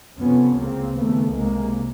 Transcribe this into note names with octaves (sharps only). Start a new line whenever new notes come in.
F2 C3 B3 C#4
C#2 C#3 A#3 C4
D#2 C#3 A3 B3
C2 C3 G#3 A#3